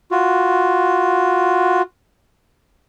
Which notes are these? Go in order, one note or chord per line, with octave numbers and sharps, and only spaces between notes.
F4 F#4